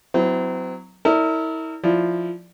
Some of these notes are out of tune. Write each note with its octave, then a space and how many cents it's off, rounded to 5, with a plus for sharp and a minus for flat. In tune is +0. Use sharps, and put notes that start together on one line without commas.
F#3 +0 C4 -35 E4 +0
E4 -35 A#4 -35 D5 -25
F3 +0 E4 +0 D5 +0